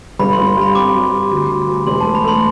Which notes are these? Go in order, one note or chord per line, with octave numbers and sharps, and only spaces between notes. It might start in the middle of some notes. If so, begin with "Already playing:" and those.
G1 B5
C6
G1
C6
G2
B5
C4 D6
F#3
G2
D2
D2
D2
E1 C6
A3 A5
B5
A3 C6